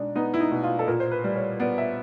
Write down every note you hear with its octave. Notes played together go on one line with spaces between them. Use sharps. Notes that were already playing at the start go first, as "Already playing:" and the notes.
Already playing: B2 G#3 D4 D#4
B3 D#4
E4
D#4
B2
F4
A4
A#2 A#4
C5
B4
G3
C#5
B3 D5
E5